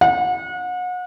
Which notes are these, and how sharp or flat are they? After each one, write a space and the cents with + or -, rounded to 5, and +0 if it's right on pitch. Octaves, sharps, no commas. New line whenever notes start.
F#5 -35